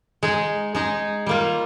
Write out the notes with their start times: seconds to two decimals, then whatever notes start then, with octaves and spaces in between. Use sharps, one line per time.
0.23 G#3 D#4 G#4
0.75 G#3 D#4 G#4
1.26 G3 A#3 F4